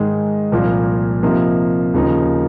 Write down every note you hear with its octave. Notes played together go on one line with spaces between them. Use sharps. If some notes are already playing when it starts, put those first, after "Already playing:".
Already playing: G#2 D#3 G#3
C2 A#2 F3 A#3
C3 F3 A#3 D#4
D#2 C#3 F3 A#3 D#4